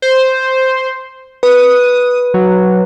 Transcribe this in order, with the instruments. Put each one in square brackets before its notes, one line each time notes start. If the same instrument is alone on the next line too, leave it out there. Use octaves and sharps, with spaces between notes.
[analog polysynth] C5
[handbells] B4 [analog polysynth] D#6
[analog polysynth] F#3